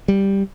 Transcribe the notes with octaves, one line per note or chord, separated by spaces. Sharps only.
G3